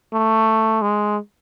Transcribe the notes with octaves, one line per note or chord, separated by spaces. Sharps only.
A3
G#3